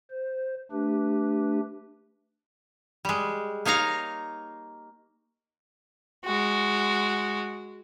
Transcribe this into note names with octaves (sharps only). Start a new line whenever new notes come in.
C5
A3 D4 G4 B4
G3 G#3
A#3 D#4 C#5 F5 A#5
G#3 F#4